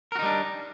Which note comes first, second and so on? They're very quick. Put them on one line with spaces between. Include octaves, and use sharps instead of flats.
A#4 F#4 D#4 G3 D4